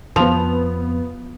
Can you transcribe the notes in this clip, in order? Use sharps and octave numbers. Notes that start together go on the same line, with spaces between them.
F2 F3 B3 F7